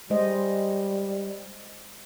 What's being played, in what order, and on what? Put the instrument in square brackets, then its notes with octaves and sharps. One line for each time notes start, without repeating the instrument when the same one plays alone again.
[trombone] G3 [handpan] G#3 C5 D#5